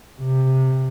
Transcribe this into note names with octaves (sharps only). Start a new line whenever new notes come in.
C3